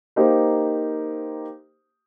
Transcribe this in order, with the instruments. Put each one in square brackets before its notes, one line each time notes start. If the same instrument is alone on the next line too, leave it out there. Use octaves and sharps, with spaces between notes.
[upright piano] A#3 D#4 G4 C5